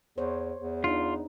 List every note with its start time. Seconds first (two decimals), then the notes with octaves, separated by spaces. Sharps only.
0.18 E2 C5 C#5
0.59 E2
0.84 D4 D#4 F4